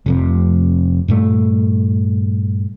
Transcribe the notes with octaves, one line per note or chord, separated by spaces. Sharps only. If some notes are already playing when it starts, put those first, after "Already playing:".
F1 F2 C3
G2 A#2 A3